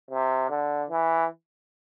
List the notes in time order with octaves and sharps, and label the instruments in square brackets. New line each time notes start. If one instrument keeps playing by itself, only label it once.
[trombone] C3
D3
E3